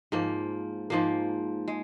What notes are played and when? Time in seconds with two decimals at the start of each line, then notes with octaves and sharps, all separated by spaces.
0.12 G#2 F3 A#3
0.90 G#2 F3 A#3
1.68 G#3